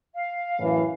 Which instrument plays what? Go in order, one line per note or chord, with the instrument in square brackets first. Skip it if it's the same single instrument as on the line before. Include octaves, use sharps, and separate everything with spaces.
[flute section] F5
[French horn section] F#2 A2 E3